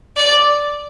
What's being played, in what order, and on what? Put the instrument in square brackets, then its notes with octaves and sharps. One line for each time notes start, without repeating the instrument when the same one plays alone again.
[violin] D5